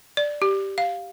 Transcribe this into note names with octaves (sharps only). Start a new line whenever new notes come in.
D5
G4
F5